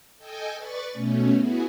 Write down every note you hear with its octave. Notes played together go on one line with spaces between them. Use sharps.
A4 D#5 G5 G#5
B4 D5 C#6 A6
B2 A3 C#4
B3 E4 F#4 G#4